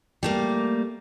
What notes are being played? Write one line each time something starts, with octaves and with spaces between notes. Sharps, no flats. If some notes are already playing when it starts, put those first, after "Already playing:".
G3 A3 A#3